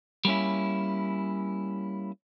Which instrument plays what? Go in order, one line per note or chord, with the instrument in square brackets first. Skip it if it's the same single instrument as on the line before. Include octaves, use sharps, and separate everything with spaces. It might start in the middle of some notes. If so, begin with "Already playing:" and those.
[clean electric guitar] G3 A#3 C4 C#4 E4